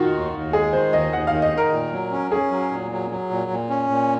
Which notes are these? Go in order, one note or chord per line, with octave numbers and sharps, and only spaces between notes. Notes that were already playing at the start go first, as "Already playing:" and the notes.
Already playing: D#3 D#4 F4 F#4
D#2
D#2
G#3 G#4
D#3 C5
D#2 D#5
D#2 F#5
F5
D#3
D#5
D#3
A#4
A#2
F#3
C#4
C#4 G#4
F#3
A#2
F#3
F#3
A#2
A#2
C#4
A#2